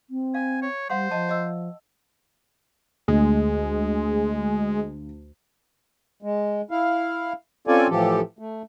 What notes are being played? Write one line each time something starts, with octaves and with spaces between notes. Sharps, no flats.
C4
F5 G#5
C#5
G3 C5 F5 F#5 C6
F3 D#5 A5
D#5 E6
D2 G#3
G#3
E4 F5
C4 C#4 F4 A4 D5 G#5
A2 E3 F3 G4 A4
A3